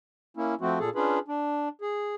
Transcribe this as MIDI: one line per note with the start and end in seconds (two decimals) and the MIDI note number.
0.37 0.55 58
0.37 0.55 61
0.37 0.55 64
0.61 0.79 53
0.61 0.79 57
0.61 0.79 60
0.61 0.79 66
0.80 0.90 46
0.80 0.90 68
0.80 0.90 69
0.95 1.19 61
0.95 1.19 62
0.95 1.19 65
0.95 1.19 68
0.95 1.19 71
1.28 1.69 62
1.81 2.15 68